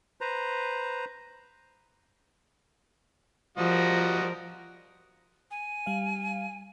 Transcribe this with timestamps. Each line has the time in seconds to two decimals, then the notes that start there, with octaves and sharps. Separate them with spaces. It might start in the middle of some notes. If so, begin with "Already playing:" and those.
0.21 B4 C5 A#5
3.58 F3 G3 F#4 A#4 D#5
5.51 G#5
5.86 G3 F5